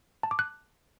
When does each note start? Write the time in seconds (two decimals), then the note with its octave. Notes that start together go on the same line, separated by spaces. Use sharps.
0.23 A5
0.31 D6
0.39 F#6